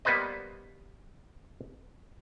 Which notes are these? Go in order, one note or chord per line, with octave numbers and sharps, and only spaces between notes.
G3 A#3 B3 B4 C5 D#5